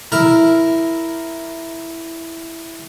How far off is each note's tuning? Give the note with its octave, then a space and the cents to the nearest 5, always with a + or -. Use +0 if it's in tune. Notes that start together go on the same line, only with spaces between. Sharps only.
E4 +0 A#4 +0